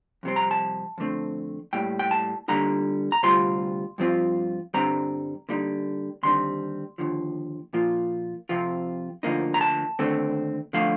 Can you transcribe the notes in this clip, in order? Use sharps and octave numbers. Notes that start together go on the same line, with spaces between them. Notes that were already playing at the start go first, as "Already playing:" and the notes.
F2 C3 G3 C4
A#5
A5
F2 D3 A3 C4
A2 G3 A#3 G5
G5
A5
D3 G3 A#3 D#4 A#5
A#5
D2 C3 G3 C4 F4 C6
G2 F3 C4 F4
G2 D3 G3 C4 A#5
D3 G3 A#3 D#4
D#2 D3 G3 C4 D#4 C6
D#2 D3 F3
A#2 F3 A#3 F4
F2 C3 F3 C4 F4
D2 D3 F3 A#3 D#4
A#5
A5
D#2 D3 A3 C4
D3 F3 A3 F5